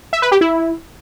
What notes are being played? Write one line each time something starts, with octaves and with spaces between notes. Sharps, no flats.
E5
B4
G4
E4